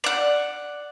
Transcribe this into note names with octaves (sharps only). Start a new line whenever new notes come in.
D5 F#5